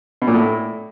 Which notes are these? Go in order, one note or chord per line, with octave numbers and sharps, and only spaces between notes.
B2
A#2
A2